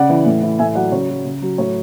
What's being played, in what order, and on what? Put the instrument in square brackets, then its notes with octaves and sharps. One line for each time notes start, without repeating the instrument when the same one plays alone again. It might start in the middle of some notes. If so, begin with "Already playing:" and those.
Already playing: [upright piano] C#3 D5 F#5
E3
A2
E3
A2 E5 G#5
F#3 D5 F#5
C#3 C#5
F#3
C#3
F#3
A2 C#5